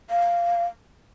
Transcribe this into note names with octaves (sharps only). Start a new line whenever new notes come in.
F5